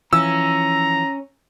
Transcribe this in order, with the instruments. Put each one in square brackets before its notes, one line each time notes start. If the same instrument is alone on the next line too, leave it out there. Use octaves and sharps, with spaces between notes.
[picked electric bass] E3 F3 [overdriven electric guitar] C#4 [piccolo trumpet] A#5 [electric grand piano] E6